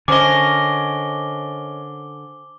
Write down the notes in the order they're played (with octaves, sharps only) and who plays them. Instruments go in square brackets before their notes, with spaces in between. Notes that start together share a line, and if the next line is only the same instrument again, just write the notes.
[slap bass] D3 [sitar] C#4 A#4 D#5 [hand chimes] C5 G#5 [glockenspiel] D6 G7